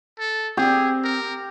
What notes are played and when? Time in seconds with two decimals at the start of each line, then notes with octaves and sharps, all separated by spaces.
0.19 A4
0.57 C4 G4 G#4
1.04 A#4